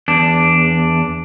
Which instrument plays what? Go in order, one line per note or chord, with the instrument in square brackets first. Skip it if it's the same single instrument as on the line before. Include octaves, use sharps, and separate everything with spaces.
[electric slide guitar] E2 D4